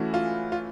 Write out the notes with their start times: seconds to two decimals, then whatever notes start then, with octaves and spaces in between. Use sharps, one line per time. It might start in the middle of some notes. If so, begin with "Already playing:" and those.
Already playing: E3 A3 C#4 E4 F#4
0.14 F4
0.52 F4